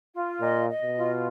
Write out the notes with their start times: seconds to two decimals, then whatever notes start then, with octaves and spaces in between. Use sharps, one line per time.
0.13 F4
0.40 A#2 D#5
0.68 D#5
0.82 B2
0.96 F4